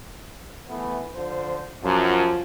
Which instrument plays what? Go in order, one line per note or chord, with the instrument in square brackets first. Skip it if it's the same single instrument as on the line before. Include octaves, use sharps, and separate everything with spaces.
[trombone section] E3 A3 B3
D3 F3 C5
[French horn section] F#2 [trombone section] F3